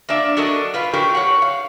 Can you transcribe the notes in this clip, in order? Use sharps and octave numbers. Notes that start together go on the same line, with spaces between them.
A#3 D4 D5 E5
F#3 D4 A4 A#4 D#5
F4 B4 F5
A2 F#3 G4 A#4
C#5 F#5
F5